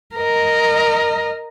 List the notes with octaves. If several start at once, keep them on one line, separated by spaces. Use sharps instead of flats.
A#4 D#5